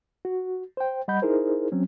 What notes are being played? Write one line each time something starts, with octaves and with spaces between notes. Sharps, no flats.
F#4
C5 G5
G3 D#5 F#5 B5 G6
D#4 E4 G#4 A#4 C5
F#3 C4 C#4